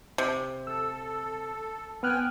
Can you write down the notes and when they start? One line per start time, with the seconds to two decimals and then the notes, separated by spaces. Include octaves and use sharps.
0.18 C3
0.67 A4 E6
2.03 B3 C4 G5 G#5 F6 F#6